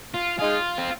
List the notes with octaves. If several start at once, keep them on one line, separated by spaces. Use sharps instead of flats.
F4
G#3 D#4 F4 G#4
C4